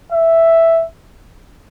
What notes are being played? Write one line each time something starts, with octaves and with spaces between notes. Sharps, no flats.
E5